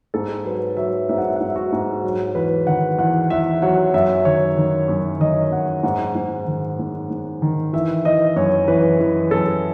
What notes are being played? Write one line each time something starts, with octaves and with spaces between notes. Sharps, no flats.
G#2 A4
F#3 B4
F#3 E5
G#2 E5
F#5
E5
F#5
G#2 E5
F#4
G#2
F#3
E2 B4
D#3 F#5
E2 F#5
E2 E5
F#3 F#5
F#2 E5
D#3 C#5
D#3
F#2 C#5
D#3 D#5
F#2 F#5
G#2 F#5
G#2
D#3
G#2
G#2
D#3
E3 E5
E3 D#5
F#2 C#5
E3 B4
E3
F#2 A4